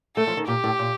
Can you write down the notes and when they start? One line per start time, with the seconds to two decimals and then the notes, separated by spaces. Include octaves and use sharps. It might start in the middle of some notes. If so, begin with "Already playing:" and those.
0.16 A3 A4
0.27 F3
0.37 D#3
0.47 A#2 G4
0.64 A2
0.79 A#2